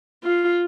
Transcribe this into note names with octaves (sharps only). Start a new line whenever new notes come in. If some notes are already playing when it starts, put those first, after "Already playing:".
F4